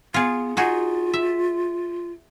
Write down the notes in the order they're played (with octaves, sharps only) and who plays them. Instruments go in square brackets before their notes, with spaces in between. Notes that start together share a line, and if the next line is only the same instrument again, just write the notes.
[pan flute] B3 [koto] F4 G#4
[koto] D#4 F#4 G#4 [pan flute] F4
[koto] E5